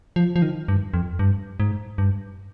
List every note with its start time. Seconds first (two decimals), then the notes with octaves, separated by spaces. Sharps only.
0.16 F3
0.36 F3
0.42 D#3
0.68 G2
0.94 F2
1.19 G2
1.60 G#2
1.98 G2